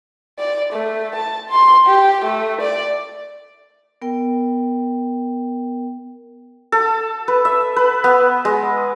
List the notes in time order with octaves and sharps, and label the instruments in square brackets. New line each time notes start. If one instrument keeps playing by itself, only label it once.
[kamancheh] D5
A3
A5
C6
G4
A3
D5
[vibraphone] B3 A#4 G5
[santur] A4
B4
E5
B4
B3
G#3